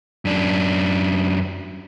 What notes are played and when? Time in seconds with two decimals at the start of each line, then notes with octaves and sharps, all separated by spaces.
0.25 F#2 D4